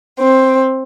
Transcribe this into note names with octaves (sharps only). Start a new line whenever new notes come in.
C4